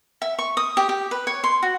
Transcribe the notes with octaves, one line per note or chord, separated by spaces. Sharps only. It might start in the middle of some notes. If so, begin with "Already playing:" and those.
E5
C#6
D#6
G4
G4
B4
C#5
C6
F#4